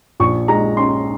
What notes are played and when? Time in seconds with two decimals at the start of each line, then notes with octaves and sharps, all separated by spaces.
0.20 A#1 C#6
0.48 G#3 A#5
0.77 C#4 C6